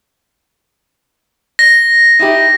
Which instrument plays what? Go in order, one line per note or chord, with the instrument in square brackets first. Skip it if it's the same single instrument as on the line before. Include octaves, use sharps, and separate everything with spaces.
[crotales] A#6
[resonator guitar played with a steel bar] D#4 E4 G4